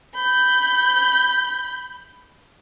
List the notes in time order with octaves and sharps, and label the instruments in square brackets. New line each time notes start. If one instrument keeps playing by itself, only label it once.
[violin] B5 G6